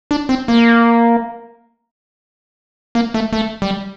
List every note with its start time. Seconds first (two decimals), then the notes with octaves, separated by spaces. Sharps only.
0.11 D4
0.29 C4
0.48 A#3
2.95 A#3
3.14 A3
3.33 A3
3.62 G3